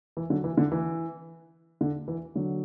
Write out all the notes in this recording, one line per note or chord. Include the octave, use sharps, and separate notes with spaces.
E3
D3 F#3
E3
D3
E3
D3
E3
D3 F#3